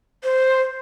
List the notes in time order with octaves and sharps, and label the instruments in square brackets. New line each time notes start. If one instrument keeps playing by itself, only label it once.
[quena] C5